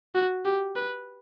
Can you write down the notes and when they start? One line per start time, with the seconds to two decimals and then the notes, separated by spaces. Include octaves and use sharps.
0.15 F#4
0.45 G4
0.76 B4